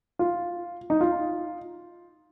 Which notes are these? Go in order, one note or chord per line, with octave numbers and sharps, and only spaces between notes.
F4
D#4
F4